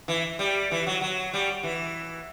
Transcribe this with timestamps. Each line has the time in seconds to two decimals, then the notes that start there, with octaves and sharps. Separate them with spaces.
0.08 E3
0.39 G3
0.71 E3
0.86 F#3
1.01 F#3
1.33 G3
1.63 E3